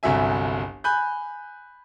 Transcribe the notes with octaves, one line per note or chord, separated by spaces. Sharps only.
G1 C2 F#3 E5 G#5
G#5 B5 F#6 G6